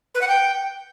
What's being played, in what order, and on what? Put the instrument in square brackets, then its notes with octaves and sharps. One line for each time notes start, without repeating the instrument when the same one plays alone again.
[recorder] B4
F#5
G5